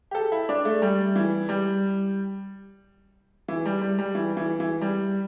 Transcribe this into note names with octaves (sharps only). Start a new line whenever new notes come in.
G4
A4
E4
D4
A3
G3
E3
G3
E3
G3
G3
G3
E3
E3
E3
G3